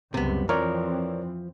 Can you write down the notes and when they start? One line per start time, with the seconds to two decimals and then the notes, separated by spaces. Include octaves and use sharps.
0.14 C#2 F#2 C3 G3 B3
0.49 F2 E3 F3 C4 A#4 C#5 D5